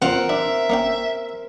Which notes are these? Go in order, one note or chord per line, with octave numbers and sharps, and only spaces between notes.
E2 C4 F4 A#4 F#5
D4 E5
A#3 C#4 G5